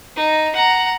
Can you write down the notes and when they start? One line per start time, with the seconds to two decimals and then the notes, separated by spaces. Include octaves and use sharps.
0.16 D#4
0.55 F#5 A#5